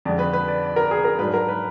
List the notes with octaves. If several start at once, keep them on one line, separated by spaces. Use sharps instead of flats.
F2 D3 G#3 D5
B4
B4
D5
D5
A#4
G#4
A#4
G#2 F#3 D4 B4
A#4
B4